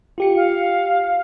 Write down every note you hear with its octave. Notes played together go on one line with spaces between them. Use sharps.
F4 G4 C#7
F5